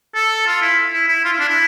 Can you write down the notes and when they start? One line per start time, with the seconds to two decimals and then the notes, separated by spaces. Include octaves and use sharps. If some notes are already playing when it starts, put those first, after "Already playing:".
0.15 A4
0.46 F4
0.62 E4
0.92 E4
1.08 E4
1.25 F4
1.32 E4
1.40 D4
1.48 E4